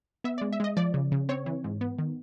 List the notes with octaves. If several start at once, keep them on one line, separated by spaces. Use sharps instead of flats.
B3 E5
D5
G#3
E5
G#3 D#5
F3 D5
C#3
C#3
C4 C#5
E3
G#2
B3
D#3